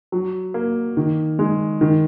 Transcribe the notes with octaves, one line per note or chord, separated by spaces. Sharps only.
F#3
A#3
D#3
G#3
D#3